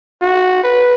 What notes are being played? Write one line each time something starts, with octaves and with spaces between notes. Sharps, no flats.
F#4
B4